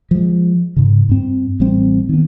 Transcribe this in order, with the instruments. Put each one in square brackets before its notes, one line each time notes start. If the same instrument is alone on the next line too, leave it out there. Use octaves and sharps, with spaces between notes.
[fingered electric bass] F3 G#3
G#2 C#3
G2 C4
A1 G3 C4
D#3 B3